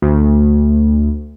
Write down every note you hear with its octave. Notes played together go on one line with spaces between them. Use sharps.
D2